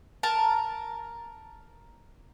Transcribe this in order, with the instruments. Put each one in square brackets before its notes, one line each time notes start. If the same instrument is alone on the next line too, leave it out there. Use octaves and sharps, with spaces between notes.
[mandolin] A#4 A5